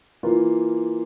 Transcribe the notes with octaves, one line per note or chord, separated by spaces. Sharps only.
E3 A#3 F4